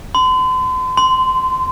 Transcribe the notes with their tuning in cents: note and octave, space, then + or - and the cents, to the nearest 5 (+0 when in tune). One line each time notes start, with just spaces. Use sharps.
C6 -40
C6 -20